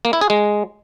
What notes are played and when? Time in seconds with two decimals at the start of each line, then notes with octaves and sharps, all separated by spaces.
0.05 A#3
0.13 E4
0.21 G#4
0.30 G#3